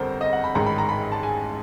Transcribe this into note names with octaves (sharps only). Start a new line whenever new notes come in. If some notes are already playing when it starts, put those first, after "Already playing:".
Already playing: G1 F2 A4 A#4 C5
D#5
F#5
B5
A1 G#2 D#3 A#5
B5
A#5
B5
A5
G#5